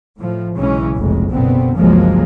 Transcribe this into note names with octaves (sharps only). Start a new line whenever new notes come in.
A2 F3
B1 C#3 E3 G#3 C#4
F1 B1 F2 G#3
F#1 B2 D3 B3 C4
G1 C#2 F3 F#3 G#3 A#3